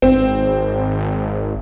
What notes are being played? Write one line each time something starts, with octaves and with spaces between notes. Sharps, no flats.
G#1 C4